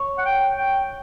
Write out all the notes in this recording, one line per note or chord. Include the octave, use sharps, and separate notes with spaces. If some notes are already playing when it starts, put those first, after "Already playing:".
Already playing: C#5
F#5
G5
G5